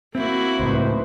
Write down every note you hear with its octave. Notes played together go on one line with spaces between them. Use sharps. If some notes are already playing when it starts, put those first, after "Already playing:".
A#3 C4 E4 F#4
C#2 A2 D#4 B4 C5